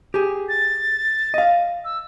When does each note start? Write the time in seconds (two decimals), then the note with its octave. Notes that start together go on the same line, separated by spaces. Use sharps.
0.14 G4 G#4
0.49 A6
1.34 D#5 F5
1.85 E6